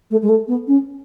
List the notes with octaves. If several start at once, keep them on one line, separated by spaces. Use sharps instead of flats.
A3
G#3
A3
B3
C#4